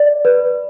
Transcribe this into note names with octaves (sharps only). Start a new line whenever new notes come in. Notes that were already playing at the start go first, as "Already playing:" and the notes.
Already playing: D5
B4